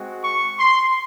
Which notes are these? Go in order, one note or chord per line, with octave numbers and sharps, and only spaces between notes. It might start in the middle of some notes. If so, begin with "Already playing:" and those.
Already playing: G#3 C4 F#4
C#6
C6